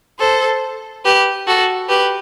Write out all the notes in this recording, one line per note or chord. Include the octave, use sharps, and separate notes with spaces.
A4 C5
G4 B4
F#4 A4
G4 B4